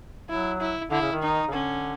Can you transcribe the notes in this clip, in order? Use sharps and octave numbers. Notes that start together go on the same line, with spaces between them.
F#3 E4
E4
D3 E4
C#3
D#3
D#4
C#3
D3 C#4